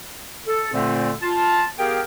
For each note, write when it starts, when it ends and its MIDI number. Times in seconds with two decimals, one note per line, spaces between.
0.48 0.70 69
0.74 1.12 46
0.74 1.12 50
0.74 1.12 57
0.74 1.12 60
1.22 1.65 65
1.22 1.65 81
1.79 2.01 59
1.79 2.01 67
1.79 2.01 68
1.79 2.01 70
1.79 2.01 77
1.79 2.01 79